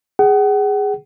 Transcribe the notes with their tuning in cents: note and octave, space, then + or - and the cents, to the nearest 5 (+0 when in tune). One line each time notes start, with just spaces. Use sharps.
G#4 -10 F#5 +35